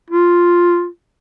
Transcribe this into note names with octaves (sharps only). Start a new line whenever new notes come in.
F4